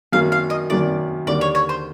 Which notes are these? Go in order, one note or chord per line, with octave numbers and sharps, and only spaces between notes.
F#2 D#3 F#3 A#3 F5
F5
D#5
F#2 D#3 F#3 A#3 D5
D#2 D3 G3 A#3 D5
C#5
C#5
C5